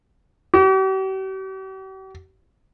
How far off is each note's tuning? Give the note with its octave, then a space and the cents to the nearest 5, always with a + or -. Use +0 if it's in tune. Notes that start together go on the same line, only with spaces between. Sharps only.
G4 -45